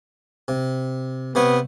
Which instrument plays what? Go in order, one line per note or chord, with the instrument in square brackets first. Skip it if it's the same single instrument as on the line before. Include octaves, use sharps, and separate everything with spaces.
[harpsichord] C3
[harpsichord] C3 C5 C#5 [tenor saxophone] B3